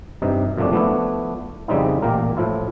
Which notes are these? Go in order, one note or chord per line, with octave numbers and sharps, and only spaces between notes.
G2 C3 D#4
F#2 C3 F3 F#3 A3 D4
F3 A3 B3 D4 E4
F2 C#3 G3 C4 D#4 E4
A1 A#2 A#3 G4 A#4
A2 F3 E4 F4